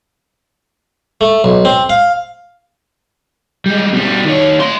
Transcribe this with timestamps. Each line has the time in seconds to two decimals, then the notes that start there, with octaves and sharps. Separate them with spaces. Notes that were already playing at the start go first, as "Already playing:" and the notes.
1.21 A3
1.44 B1
1.65 C4
1.89 F5
3.66 G3 G#3
3.92 B2 G3
4.25 D#3 C#5
4.60 A3 C6